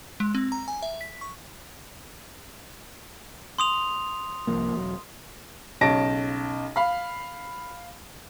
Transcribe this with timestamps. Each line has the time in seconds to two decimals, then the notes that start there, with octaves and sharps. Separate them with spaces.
0.20 G#3
0.35 C4
0.52 A#5
0.68 G#5
0.83 E5
1.01 B6
1.21 C#6
3.58 C6 D#6 F7
4.47 C2 F3 A#3
4.76 E1 F#3
5.81 B1 C#3 C#5 A5 A#6 D7
6.76 F5 B5